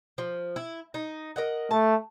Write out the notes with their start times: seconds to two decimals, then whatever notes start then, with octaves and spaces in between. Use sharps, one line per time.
0.18 F3
0.56 E4
0.94 D#4
1.36 A#4 D#5 F#5
1.71 A3 A5